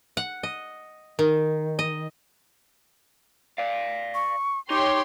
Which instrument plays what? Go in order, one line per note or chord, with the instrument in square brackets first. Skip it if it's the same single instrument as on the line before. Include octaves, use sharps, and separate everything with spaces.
[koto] F#5
D#5
D#3
D#5
[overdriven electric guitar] D5 F5
[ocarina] C#6
[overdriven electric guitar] D#4 [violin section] G4 C#5 C6 [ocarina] D6